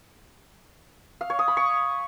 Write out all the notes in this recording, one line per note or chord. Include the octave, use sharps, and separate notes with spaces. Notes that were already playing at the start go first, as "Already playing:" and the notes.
F5
C#5
D#6
B5
C#6